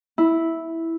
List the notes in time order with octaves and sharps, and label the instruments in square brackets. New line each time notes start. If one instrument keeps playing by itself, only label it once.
[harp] E4